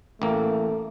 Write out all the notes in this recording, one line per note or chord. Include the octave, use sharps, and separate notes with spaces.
A1 A3 A#3